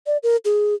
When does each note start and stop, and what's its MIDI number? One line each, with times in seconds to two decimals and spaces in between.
0.07 0.17 74
0.23 0.37 70
0.45 0.74 68